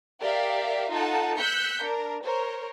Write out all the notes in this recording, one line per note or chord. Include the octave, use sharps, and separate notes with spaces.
G4 A#4 D5 E5 F5
D#4 F4 A4 F#5 A5
E6 F#6 G6 B6 C#7
D4 A#4
A#4 C5 C#5